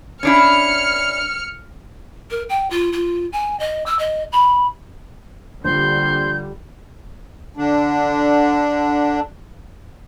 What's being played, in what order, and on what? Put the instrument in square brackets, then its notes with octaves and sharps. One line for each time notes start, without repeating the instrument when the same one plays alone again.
[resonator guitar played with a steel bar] C#4 D4 E4 [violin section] F6 C#7
[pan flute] A#4
G5
F4
F4
G#5
D#5
E6
D#5
B5
[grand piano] A#1 [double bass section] D3 G3 [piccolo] C6 [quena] G6
[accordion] D3 D4